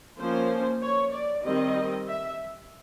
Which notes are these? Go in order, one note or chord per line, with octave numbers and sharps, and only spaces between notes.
F3 A#3 C#4 C5
C#5
D5
D#3 G3 C4 D#5
E5